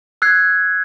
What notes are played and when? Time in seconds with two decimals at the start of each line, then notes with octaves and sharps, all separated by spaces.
0.22 E6 F#6 G#6 C7